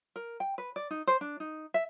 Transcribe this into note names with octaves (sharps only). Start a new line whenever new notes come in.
A#4
G5
B4
D5
D#4
C5
D4
D#4
E5